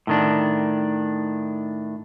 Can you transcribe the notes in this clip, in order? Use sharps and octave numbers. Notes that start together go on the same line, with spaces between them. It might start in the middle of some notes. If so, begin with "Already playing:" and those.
A2 D#3 D4